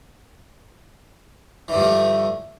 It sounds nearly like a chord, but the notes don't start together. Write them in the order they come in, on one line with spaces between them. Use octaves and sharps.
E3 D3 G2 F3 A3